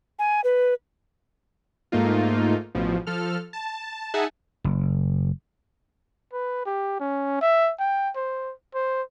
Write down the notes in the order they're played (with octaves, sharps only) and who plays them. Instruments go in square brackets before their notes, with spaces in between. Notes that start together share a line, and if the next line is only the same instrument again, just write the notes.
[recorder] G#5
B4
[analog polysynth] G#2 A3 A#3 D#4 F4
A1 B2 F3
F3 A4 F6
A5
D#4 G#4 E5 F#5 G#5 A5
[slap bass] F#1
[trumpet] B4
G4
C#4
E5
G5
C5
C5